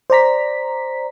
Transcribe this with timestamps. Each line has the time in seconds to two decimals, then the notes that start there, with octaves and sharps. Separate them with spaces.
0.10 C5 D5 A#5 B6